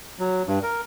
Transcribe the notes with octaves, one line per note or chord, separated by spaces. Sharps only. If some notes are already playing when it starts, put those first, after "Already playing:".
F#3
G2
A#4